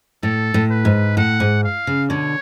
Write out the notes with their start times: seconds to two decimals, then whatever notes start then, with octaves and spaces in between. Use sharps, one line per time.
0.23 A2 A4
0.54 A2
0.70 B4
0.85 G#2
1.17 A2 F#5
1.40 G#2
1.64 F5
1.87 C#3
2.10 B2 D3 C#5